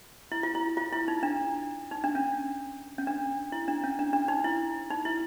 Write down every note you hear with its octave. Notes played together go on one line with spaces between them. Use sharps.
E4
F4
E4
F4
E4
D#4
D4
D#4
D4
C#4
C#4
D4
E4
D4
C#4
D4
D4
D#4
E4
D#4
E4